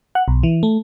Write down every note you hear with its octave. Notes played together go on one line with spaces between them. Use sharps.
F#5
B1
E3
A3